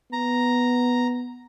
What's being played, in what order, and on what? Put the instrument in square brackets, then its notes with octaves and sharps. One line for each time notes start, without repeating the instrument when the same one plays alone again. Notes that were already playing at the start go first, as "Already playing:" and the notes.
[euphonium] B3 [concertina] A#5